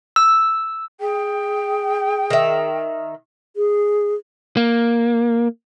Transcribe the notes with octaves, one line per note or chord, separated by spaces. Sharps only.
E6
G#4 G5
D#3 E5
G#4
A#3